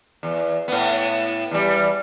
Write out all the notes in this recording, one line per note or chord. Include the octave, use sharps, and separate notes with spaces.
E2
A2 B3
E2 G3